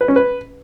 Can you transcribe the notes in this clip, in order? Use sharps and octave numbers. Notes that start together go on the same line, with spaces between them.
B4
C#4
B4